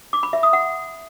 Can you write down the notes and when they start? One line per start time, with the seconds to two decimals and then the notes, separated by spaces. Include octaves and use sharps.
0.13 D6
0.23 B5
0.33 E5
0.43 D#6
0.53 F#5